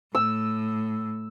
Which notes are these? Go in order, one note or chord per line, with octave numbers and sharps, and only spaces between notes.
A2 E6